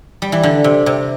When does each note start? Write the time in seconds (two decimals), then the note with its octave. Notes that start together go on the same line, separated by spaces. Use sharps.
0.22 G3
0.32 E3
0.43 D3
0.64 C3
0.86 C3